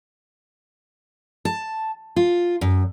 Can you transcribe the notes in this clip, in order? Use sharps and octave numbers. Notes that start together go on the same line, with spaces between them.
A5
F4
F#2